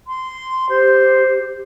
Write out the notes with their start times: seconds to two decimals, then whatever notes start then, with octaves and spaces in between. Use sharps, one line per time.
0.07 C6
0.69 G4 C5